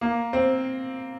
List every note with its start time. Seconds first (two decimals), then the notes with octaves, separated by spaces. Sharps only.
0.01 A#3
0.33 C4